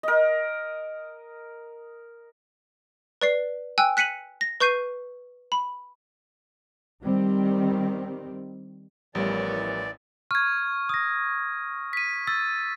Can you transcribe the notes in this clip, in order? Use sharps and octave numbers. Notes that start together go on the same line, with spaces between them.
A#4 D#5
B4 D5 C7
G5 G#5 E6 F#6
F#6 B6 C#7 D#7 F#7
A#6
B4 C#6 G6 C7 D#7
B5
D#3 G3 C4
A1 E3 F3 G3 B3 A#4 C#5 D5
C#6 F6 G#6
D#6 A#6
B6 D#7
E6 A6